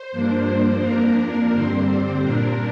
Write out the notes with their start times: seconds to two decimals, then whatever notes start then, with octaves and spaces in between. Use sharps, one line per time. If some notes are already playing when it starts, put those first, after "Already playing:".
Already playing: C5
0.12 G2 F3 A#3 D4
0.81 F2 F3 A#3 D4 A#4
1.52 G2 D3 G3 C4 C5
1.86 C5
2.21 A#2 G3 A#3 D4 A#4